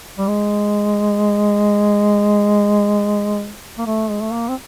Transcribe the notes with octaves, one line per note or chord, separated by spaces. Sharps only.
G3
G#3
A#3
A3
G#3
A3
A#3
C4